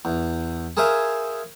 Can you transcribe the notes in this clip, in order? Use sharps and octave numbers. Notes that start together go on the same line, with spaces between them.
E2
G#4 A#4 C5 E5 F5 G#5